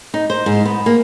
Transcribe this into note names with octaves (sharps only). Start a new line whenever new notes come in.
D#4
C5
G#2
B3
A#3